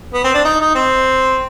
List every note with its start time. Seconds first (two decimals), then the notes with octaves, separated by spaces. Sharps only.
0.14 B3
0.24 C4
0.34 D4
0.45 D#4
0.60 D#4
0.75 C4